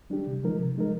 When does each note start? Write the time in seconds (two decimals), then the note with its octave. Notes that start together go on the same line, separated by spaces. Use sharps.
0.10 G3 D4 G4
0.27 C3
0.43 F3 G#3 D#4 A#4
0.59 C3
0.76 F3 G#3 D#4 A#4